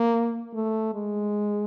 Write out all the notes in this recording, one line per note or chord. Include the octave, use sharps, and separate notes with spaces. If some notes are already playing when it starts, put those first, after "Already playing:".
Already playing: A#3
A3
G#3